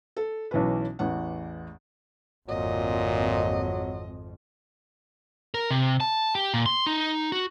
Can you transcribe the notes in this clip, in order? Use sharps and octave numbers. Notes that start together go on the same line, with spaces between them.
A4
B1 E3 C#4 B4
A1 E2 F#5
G#1 F2 A#2 F#3 D#5
A#4
C3
A5
G4
A#2
C6
D#4
F#4